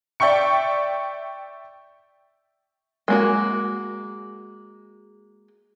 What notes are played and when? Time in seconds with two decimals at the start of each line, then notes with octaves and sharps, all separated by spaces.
0.20 D5 E5 G5 C#6 C#7
3.08 G#3 A#3 F#4